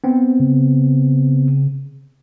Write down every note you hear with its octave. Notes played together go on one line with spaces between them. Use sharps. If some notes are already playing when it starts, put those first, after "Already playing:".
B3 C4
C#3